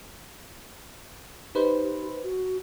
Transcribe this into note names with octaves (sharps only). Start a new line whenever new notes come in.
D#4 G4 B4 C5
F#4